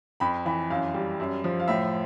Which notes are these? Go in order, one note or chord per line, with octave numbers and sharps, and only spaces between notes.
F2 B5
E3 B5
F#2 F5
G3
F#2
F3
F5
A2 E5